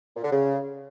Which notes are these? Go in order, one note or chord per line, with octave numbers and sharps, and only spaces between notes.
A#2
D3
C#3